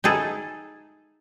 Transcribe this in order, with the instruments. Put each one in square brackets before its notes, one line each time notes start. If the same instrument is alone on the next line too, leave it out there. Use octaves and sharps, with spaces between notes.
[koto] D#4 E4 G#4 A4